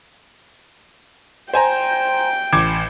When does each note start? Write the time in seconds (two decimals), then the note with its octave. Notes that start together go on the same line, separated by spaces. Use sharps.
1.54 C5 G5 G#5 A#5
2.53 A1 D6 G#6